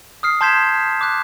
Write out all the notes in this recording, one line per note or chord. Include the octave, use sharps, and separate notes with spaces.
D#6 F6 C7
A5 C6 G6 G#6 B6 E7
D6 F#6